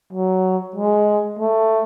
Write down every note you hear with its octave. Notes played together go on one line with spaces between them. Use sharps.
F#3
G#3
A3